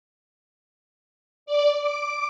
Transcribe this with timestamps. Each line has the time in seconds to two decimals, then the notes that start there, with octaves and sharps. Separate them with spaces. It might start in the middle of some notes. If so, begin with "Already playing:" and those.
1.46 D5
1.79 D6